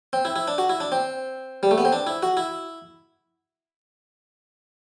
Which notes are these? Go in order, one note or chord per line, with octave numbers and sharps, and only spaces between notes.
C4
E4
E4
D4
F#4
E4
D4
C4
G3
A3
B3
C4
D4
E4
F#4
E4